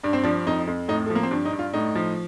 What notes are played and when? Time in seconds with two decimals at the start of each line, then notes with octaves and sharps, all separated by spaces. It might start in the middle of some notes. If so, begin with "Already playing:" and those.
0.03 G2 D4
0.13 C4
0.24 F3 D4
0.47 F2 D#4
0.67 F2
0.88 A2 D#4
1.06 A3
1.10 F3
1.15 A#3
1.23 C4
1.31 G2 D4
1.45 D#4
1.53 G2
1.59 F4
1.74 A2 D#4
1.95 F3